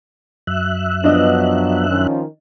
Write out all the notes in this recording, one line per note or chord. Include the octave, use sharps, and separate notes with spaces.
F#2 E5 F#6
F3 F#3 B3 D4 D#5
D#3 F3 C#4